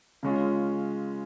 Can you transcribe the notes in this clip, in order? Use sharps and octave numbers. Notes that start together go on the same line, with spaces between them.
C#3 G#3 C#4 F4